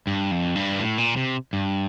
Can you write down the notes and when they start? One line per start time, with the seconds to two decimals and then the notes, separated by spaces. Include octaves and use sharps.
0.07 G2
0.31 F2
0.56 G2
0.79 A2
0.98 A#2
1.16 C3
1.53 G2